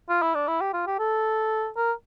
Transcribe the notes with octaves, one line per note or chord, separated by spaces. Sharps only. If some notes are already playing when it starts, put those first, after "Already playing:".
F4
E4
D4
E4
G4
F4
G4
A4
A#4